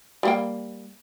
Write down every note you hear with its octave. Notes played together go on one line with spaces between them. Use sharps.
G3 A#3 G5